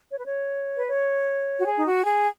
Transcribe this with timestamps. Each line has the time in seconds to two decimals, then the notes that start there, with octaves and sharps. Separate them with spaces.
0.10 C#5
0.18 B4
0.26 C#5
0.77 B4
0.88 C#5
1.59 F#4
1.66 G#4
1.76 D#4
1.85 F#4
2.05 G#4